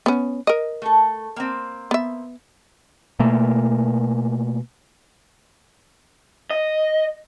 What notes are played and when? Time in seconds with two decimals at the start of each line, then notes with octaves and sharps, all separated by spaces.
0.06 B3 C#4
0.47 A#4 D#5
0.82 A3 A4
1.36 A#3 C4
1.91 B3 E5
3.20 B2 A3 A#3
6.50 D#5